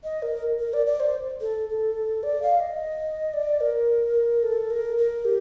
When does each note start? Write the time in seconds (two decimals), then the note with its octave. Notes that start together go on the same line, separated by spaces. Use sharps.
0.04 D#5
0.22 A#4
0.59 A#4
0.74 D5
0.86 D5
1.00 C5
1.41 A4
1.69 A4
2.23 D5
2.42 F5
2.60 D#5
3.34 D5
3.61 A#4
4.43 A4
4.70 A#4
4.97 A#4
5.25 G4